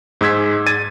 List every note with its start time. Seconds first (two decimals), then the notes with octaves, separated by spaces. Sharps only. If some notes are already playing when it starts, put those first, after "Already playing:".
0.21 G#2 G#3 E6 G#6 B6
0.66 G#6 A6 D#7